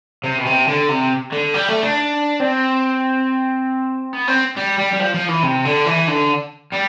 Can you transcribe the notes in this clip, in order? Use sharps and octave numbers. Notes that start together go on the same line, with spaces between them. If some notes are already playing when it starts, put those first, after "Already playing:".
C3
B2
C3
D3
C3
D3
G3
A3
D4
C4
B3
C4
G3
G3
G3
F3
F3
E3
C3
D3
E3
D3
G3